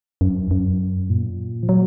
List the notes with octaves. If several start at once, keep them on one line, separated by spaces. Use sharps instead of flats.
F#2
F#2
A#2
F3
F#3